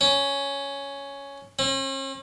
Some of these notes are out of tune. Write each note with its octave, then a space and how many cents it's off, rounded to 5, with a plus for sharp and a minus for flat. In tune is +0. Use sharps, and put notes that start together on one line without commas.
C#4 +5
C#4 -45